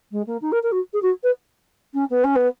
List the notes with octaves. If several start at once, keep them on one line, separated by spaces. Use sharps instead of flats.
G#3
A#3
D#4
A#4
A#4
F#4
G#4
F#4
B4
C#4
B3
C#4
B3